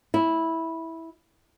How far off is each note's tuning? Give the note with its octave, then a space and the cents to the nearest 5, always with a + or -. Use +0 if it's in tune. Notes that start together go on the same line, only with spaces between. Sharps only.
E4 -10